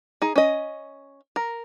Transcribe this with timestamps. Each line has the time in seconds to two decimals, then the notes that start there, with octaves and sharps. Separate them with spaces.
0.22 D#4 G#4
0.36 C#4 D#5
1.36 A#4